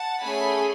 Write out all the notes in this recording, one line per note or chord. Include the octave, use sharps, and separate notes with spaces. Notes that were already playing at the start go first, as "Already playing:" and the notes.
Already playing: F#5 A5
A3 C#4 G#4 G#5 B5